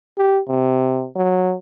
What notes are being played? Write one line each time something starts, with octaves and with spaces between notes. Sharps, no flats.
G4
C3
F#3